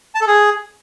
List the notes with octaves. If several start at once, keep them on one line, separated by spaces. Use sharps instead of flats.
A5
A4
G#4